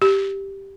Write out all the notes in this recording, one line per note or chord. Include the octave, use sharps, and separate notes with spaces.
G4